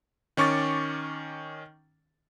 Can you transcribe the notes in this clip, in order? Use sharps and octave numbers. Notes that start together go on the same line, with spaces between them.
D#3 C#4 C#6 D6 A6